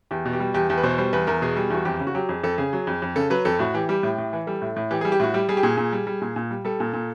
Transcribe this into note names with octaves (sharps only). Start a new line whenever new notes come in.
E2 G4
B2
G4
G3
E2 G4
E2 G4
B4
B2 C5
G3 C5
E2 B4
E2 A#4
B2 G#4
G3
E2 F#4
F2 G4
C#3
F#4
F#3 G4
F2 G#4
F2 A4
C#3 G#4
F#3
F2
F2
C#3 A4
F#3 B4
F2 A4
A2 F#4
E3 G4
G3 G4
A2
A2
E3
G3 A4
A2
A2
E3 G4
G#4
G3
G4
A2 F#4
G3 G4
G3 G#4
G4
A#2 G#4
A#2
G3
G3
A#2
A#2
G3
G3 A4
A#2
A#2